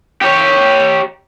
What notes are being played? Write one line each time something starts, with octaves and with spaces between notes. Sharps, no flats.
G4 C#5